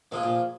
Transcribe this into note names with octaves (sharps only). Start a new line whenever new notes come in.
C3 F3 A#3 F4 G#4
A#2